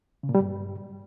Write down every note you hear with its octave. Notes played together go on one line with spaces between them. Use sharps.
C#3
A#2
G3
G2